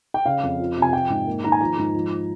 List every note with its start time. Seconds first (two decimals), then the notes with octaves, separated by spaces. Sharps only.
0.14 G5
0.26 C#3 F5
0.43 F2
0.60 F3
0.76 C3
0.82 G#5
0.93 F3 G5
1.10 G#2
1.27 A#3
1.44 D#3 A#5
1.52 G#5
1.61 F3 A#5
1.78 G#2
1.95 F3